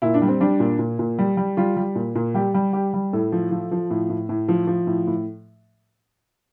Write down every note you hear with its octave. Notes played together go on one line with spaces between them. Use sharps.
A#2 E4
D4
G3
C4
G3 D4
A#2
A#2
A#2
G3
G3
G3 F4
G3
A#2
A#2
G3 G4
G3
G3 G4
G3
A2 A4
F3
F3
F3
A2
A2
A2
F3
F3
A2
A2